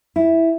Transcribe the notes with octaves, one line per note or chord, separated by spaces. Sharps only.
E4